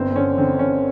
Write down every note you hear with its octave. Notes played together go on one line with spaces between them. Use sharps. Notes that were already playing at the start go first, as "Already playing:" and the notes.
Already playing: G1 C4
C4
D3 C#4
D3 C4
D3 C#4